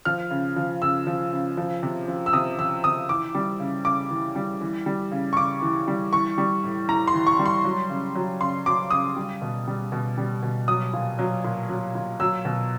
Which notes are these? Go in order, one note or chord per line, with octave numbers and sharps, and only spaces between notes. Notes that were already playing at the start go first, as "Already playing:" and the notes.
F3 F6
C#3
F3
C#3 E6
F3
C#3
F3
C3
F3
E6
C3 D#6
F3 E6
C3 D#6
E3 D6
G3
C#3
C#3 D6
E3
G3
E3
G3
C#3
C#6
C#3 D6
E3
G3
E3 C#6
G3
A2
A2 A#5
C6
E3
C#6
G3
C6
F#3
C#3
F#3
C#3 C6
F#3 D6
C#3 D#6
G3
B2
G3
B2
G3
B2
F#3 D#6
A#2
F#3
A#2
F#3
A#2
F#3 E6
B2